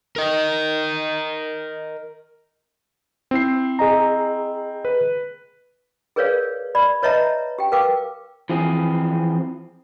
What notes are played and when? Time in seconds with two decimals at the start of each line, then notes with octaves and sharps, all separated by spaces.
0.16 A#4 D#5
3.31 C4 E4 C7
3.79 G#4 D#5 A#5
4.85 B4
6.16 G#4 A#4 B4 C#5 D5 F5
6.75 D5 B5
7.03 B4 C#5 D#5 E5 A5 A#5
7.59 G4 G5
7.72 A#4 B4 F5 G5 D6
8.49 E3 F3 C4 G#4